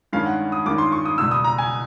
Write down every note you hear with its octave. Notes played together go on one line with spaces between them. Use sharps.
G2 D#3 G#3 C#4 F5
F#5
D#6
G2 D#3 G#3 C#4 D6
C6
C#6
D#6
C#2 B2 G3 E6
D#6
A#5
G#5